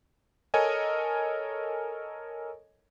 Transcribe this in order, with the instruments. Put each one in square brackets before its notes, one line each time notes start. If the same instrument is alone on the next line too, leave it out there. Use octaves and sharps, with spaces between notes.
[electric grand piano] A4 A#4 C#5 D#5 G#5